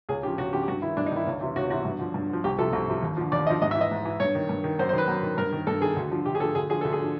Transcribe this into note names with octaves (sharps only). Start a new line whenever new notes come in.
C#2 G#4
C#3 F3 G4
C#2 F#4
C#3 F3 G4
G4
G2 F#4
D#3 E4
G2 D4
D#4
D#3 E4
C#2
C3 E3
C#2 F#4
C3 E3 F#4
G2
D3 F3
G2
D3 F3
C2 G4
C3 F3 A4
C2
C3 F3
D#2
D3 F3
D#2 D5
D3 F3 D#5
G#2 D#5
E5
E3
D#5
G#2
E3
G2 C#5
D#3
G2
D#3
F#2 C5
C5
D#3 B4
F#2
D#3
G2 A#4
D#3
G2 A4
D#3 G#4
D2
D3 F3
D2 G4
G#4
D3 F3 A4
D2 G#4
D3 F3 G#4
D2 A4
G#4
D3 F3